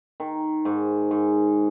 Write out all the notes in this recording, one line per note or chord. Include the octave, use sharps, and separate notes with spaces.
D#3
G#2
G#2